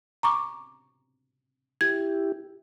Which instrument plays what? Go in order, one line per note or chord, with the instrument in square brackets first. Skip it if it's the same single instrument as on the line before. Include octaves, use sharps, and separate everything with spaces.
[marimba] A#5 C#6 D6
[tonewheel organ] E4 G4 [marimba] G#6